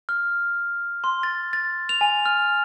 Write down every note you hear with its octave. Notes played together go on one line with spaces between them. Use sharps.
F6
C6
A6
A6
F7
G#5
F6